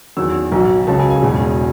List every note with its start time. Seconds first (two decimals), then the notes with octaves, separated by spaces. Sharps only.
0.17 E2 D#3 F#3 E6
0.52 B1 B2 F#3
0.87 C#2 C#3 F#3 A5
0.99 G#5
1.10 G#5
1.22 E1 E2 B2 F#3